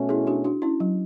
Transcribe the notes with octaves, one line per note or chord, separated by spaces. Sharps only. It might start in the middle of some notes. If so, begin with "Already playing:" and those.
Already playing: B2 A3 C#4
E4 G#4
D4 F#4
D4 F#4
C#4 E4
F#3